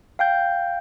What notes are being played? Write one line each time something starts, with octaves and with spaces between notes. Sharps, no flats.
F5 G5 G6